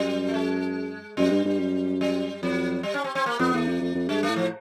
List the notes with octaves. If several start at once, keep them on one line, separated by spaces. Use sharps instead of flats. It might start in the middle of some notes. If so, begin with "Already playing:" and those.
Already playing: F#2 G3
A3
G#3
F#2 G3
G2
G2
F#2
G3
F2 F#3
G3
C#4
C4
C4
A#3
F2 B3
E2 A3
F2
F2
F2
G2 G#3
A3
A2
F3